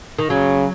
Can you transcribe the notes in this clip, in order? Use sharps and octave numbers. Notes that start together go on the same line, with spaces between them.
D#3
C#3 F#3